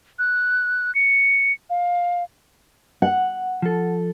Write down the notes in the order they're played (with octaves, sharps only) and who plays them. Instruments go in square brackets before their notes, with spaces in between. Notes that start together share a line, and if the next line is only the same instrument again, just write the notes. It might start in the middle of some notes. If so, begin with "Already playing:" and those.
[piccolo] F#6
C#7
F5
[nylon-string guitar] F#5
[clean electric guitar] F3 A4